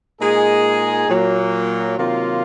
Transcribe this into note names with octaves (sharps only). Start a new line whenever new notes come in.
A#2 G#3 D#4 G#4
A#2 F#3 A#3
C3 D#3 F#3 A#3 F4